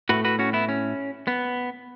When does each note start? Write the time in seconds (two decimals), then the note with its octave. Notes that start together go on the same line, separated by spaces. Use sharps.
0.09 A2 A3 F#4 B4
0.25 F#4 B4
0.39 C#4 F#4
0.53 B3 E4
0.69 C#4
1.28 B3